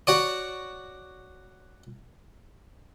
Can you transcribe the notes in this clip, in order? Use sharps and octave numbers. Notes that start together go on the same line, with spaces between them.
F#4 C#5 D5